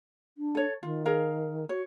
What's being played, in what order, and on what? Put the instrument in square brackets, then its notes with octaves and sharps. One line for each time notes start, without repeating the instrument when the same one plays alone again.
[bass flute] D4
[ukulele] A4 C#5
[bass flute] D#3 [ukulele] F4
[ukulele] G#4 A#4 F5
[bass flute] F#4 [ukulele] C#5